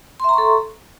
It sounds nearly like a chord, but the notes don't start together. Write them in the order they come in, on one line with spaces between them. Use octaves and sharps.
C6 E5 A#5 C#6 A4